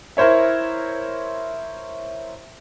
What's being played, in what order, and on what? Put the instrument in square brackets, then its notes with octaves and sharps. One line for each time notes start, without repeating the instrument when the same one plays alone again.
[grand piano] E4 A#4 C5 C#5 E5